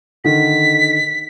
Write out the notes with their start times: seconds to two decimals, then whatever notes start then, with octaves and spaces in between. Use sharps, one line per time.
0.25 D3 D#3 B6